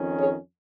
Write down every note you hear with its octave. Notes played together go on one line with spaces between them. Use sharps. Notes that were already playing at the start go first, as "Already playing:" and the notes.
Already playing: F2 D#3 C#4
G#4 C#5